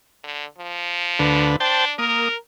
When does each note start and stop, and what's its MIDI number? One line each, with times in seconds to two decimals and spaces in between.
0.24 0.45 50
0.58 1.55 53
1.19 1.56 38
1.19 1.56 50
1.19 1.56 71
1.60 1.93 62
1.60 1.85 72
1.60 1.85 79
1.60 1.85 81
1.99 2.28 58
1.99 2.35 70
1.99 2.28 87